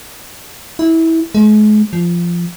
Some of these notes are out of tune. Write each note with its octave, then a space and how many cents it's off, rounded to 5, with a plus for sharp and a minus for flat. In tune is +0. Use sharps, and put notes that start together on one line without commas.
E4 -20
G#3 +40
F3 -15